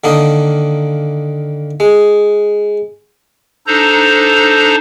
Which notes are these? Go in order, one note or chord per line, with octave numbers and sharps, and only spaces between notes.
D3 D#3 A#3 D#5
G#3
D4 D#4 A4 C5 A#5